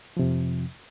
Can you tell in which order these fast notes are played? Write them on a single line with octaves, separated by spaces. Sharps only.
F3 C3 F2